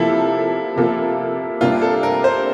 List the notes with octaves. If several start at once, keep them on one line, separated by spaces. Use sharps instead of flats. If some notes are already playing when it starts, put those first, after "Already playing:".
Already playing: C3 F3 A#3 E4 F4 A4
C3 F3 A#3 F4 A4
C3 G3 A#3 D4 F4
A4
A#4
C5